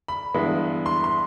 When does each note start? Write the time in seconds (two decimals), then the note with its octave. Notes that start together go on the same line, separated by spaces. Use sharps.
0.08 B5
0.34 G2 E3 G#3 B3
0.86 C6
1.04 C6